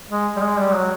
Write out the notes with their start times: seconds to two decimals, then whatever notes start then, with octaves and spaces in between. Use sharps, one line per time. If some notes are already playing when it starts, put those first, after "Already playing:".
0.09 G#3
0.36 G3
0.41 G#3
0.58 G3
0.73 F#3